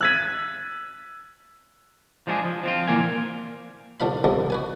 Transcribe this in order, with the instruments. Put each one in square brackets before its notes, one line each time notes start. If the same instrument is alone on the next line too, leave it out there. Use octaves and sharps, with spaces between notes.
[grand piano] E6 G#6 D#7 [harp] F#6 A6 B6
[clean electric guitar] F3 G#3 D4 F4 G#4
F3
F3 C4 F4
A#2 E3 A#3 F5 G#5
[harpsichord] C2 D3 F3 F5 B5
C2 F2 C#3 G3 G#3
F#4 B4 G#5